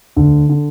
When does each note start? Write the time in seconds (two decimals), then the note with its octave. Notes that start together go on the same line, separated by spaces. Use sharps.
0.16 D2 D3
0.49 D3